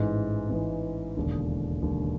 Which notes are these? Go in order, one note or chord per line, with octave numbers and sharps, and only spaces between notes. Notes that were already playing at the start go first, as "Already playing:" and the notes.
Already playing: A1 G#2 E3 G#3
A1 G#2 E3 G#3
E1 D#2 D3
E1 D#2 D3